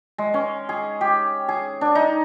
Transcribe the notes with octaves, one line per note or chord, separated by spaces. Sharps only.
G#3
C#4
G#4
G4
G#4
D4
D#4